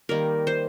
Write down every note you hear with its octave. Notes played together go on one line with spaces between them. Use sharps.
D#3 G3 A#3 A#4
C5